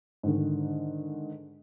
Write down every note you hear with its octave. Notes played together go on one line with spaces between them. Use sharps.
G#2 D3 D#3